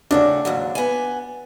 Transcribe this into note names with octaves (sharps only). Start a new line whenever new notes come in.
A2 C#3 D4 F#4
D#2 G#2 F#3
B3 G#5